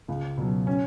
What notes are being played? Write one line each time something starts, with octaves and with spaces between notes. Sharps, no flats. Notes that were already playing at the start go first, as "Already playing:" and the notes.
C#2
B2 F#3
C#4